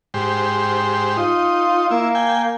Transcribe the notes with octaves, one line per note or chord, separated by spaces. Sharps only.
G#2 G4 C5
D#4 F4
A#3 E4
G5 G#5